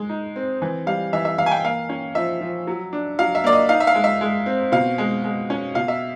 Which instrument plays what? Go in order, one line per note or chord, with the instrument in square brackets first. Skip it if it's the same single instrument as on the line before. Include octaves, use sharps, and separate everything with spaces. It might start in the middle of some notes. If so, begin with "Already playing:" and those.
Already playing: [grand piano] G#3
D#4
C4
E3
G3 F5
E3 E5
E5
E3 F5
G#5
G5
A#3 F5
C#4
F3 E5
F3
F#3
D4
F#3 F5
E5
A#3 D5
D#5
D#4 F5
E5
F5
G#3
E5
G#3
C4
B2 F5
G#3
G#3
C#4
B2 F5
E5